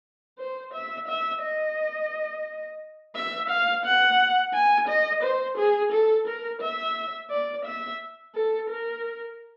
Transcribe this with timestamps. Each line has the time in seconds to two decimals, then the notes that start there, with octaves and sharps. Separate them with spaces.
0.38 C5
0.73 E5
1.07 E5
1.42 D#5
3.15 E5
3.49 F5
3.85 F#5
4.54 G#5
4.88 D#5
5.23 C5
5.57 G#4
5.92 A4
6.27 A#4
6.61 E5
7.30 D5
7.65 E5
8.35 A4
8.69 A#4